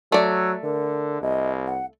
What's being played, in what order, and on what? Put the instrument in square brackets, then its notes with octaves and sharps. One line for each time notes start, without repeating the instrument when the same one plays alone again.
[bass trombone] F#3 [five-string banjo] A3 D5 [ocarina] E6
[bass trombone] D3 [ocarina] A#4
[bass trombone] C2 [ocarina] D#5
[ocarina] F#5